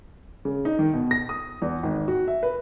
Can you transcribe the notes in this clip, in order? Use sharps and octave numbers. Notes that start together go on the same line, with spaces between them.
C#3
D#4
D#3
B2
A#6
D#6
E2
G#1
F#4
E5
B4